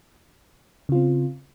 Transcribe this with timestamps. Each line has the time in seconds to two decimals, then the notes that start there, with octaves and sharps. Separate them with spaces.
0.89 C#3
0.92 F4
0.95 C4